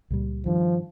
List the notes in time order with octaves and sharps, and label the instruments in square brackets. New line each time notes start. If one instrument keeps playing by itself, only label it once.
[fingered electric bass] C#2 A#2 G3
[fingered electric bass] G2 D#3 [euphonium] F3